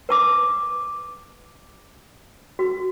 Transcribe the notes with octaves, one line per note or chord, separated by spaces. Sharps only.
B4 A5 D6
F#4